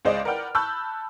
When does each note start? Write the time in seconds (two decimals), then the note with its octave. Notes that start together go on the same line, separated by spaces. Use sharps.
0.05 C#2 G#4 C5 D5 D#5
0.25 A#4 B4 D5 F#5 G5 F6
0.55 A5 B5 C#6 E6 F#6 G6